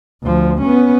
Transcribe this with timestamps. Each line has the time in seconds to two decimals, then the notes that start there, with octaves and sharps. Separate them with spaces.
0.22 D2 F3
0.62 B3 C#4